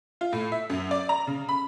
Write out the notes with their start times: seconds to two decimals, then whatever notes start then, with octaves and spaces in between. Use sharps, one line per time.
0.21 F4
0.33 A2
0.52 E5
0.70 F#2
0.91 D5
1.09 A#5
1.27 C#3
1.49 B5